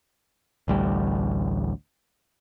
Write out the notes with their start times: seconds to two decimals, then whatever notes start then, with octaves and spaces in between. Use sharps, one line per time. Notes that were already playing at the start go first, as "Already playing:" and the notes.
0.68 A1 D2 G3